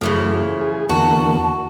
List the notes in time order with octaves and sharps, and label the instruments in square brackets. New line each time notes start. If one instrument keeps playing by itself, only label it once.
[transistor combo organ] F#2 A3 [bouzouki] C#3 E3 F3
[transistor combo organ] G#4
[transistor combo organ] E2 D3 A#3 [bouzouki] F#4 [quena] A5